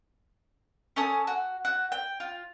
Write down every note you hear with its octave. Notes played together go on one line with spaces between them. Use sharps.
C#4 A4 G#5 D#6
F#4
F#4
G5
F4